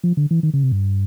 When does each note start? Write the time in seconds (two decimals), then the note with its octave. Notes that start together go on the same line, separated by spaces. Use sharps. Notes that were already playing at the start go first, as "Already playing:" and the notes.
0.04 F3
0.17 D3
0.31 E3
0.43 D#3
0.53 C#3
0.63 C3
0.72 G2